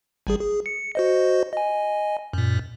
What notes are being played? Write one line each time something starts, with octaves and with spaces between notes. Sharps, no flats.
G#1 G3 G#4
G#4
C#7
F#4 C5 D#5
D#5 G#5
F#2 A#2